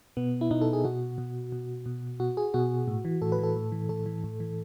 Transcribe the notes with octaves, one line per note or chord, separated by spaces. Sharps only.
B2 B3
E4
B2 D#4
A4
G#4
B2 F#4
B2
B2
B2
B2 F#4
G#4
B2 F#4
A2
E3
A2 A4
B4
E3 A4
A2
E3
A2 A4
E3
A2
E3